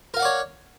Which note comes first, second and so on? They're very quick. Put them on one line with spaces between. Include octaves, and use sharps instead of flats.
A#4 F5 F#5 D5 C#5